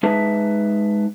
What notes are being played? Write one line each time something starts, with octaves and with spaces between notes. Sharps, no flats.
G#3 D#4 G#4 B4 E5 A5